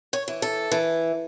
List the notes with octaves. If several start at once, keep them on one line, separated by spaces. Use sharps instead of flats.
C#5
E3
A4
E3